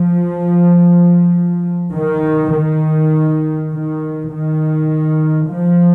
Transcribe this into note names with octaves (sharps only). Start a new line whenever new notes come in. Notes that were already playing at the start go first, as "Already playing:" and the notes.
Already playing: F3
D#3
D#3
D#3
D#3
F3